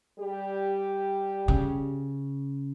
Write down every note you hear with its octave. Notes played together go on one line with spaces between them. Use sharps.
G3 G4
C#3